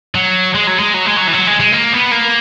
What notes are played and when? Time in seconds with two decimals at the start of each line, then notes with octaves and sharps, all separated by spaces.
0.15 F#3
0.55 G#3
0.67 F#3
0.79 G#3
0.94 F#3
1.06 G#3
1.16 F#3
1.27 E3
1.33 F#3
1.47 G#3
1.60 G#3
1.72 A#3
1.93 B3
2.11 A#3